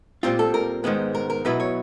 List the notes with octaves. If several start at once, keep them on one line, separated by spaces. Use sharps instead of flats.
A#2 G3 C4 F4
A4
A#4
G#2 D#3 G#3 B3
A#4
A#4
B2 F#3 B3 E4 B4
C#5